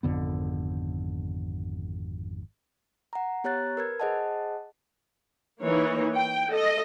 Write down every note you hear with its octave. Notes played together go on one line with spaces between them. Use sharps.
G#1 F2 D3 B3
F#5 A#5
B3 G4 C#5 A#5 F#6 A6
A#4 B4 G#6
G#4 C5 D#5 F#5 A5
E3 A#3 D#4 C#5
G5
A4 D#5